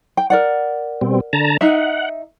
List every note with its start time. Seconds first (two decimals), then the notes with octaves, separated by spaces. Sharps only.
0.17 G5
0.30 A#4 D5 F#5
1.01 B2 G3 C4
1.33 D3 A5 A#5
1.61 D#4 E5 F#5